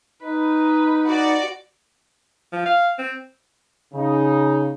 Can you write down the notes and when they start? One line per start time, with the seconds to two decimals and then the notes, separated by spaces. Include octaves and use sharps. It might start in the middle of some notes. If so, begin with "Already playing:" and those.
0.23 D#4 B4
1.06 F#4 D5
2.52 F3
2.66 F5
2.99 C4
3.94 C#3 D#4